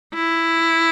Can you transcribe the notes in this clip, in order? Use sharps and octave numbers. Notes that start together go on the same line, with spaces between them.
E4